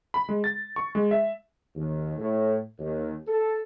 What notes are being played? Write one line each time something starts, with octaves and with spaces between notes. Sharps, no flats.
B5
G#3
A6
C#6
G#3
E5
D#2
A2
D#2
A4